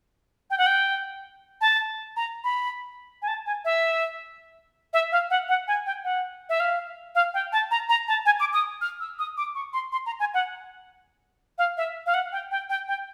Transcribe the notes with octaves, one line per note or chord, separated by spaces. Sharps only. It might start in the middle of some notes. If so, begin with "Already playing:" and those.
G5
F#5
G5
A5
A#5
B5
G#5
A5
G#5
E5
E5
F5
F#5
F#5
G#5
G5
F#5
E5
F5
F5
G5
A5
A#5
A#5
A5
G#5
D6
D#6
F6
E6
D#6
D6
C#6
C6
C6
A#5
G#5
F#5
F5
E5
F5
F#5
G5
G5
G5
G5